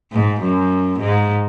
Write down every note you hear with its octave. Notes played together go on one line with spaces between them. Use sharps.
G#2
F#2
G#2